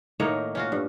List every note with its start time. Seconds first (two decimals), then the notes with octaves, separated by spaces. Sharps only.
0.20 A2 D#3 A#3 C#5
0.55 C#4 F4 F#4
0.72 G2